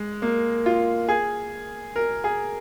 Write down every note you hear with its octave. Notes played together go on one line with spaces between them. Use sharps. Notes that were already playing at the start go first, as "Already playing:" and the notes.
Already playing: G#3
A#3
F4
G#4
A#4
G#4